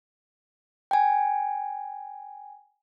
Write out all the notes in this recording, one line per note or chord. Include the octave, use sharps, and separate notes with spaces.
G5 G#5